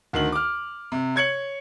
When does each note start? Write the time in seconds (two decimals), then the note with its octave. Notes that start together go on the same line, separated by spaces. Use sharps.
0.13 D2 D#3 F#7
0.32 D6 F6
0.92 C3
1.16 C#5 G#6 C#7 F#7